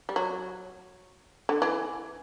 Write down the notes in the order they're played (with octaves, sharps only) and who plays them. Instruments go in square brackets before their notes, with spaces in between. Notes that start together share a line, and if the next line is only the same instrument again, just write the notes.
[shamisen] G3
F#3
D3
E3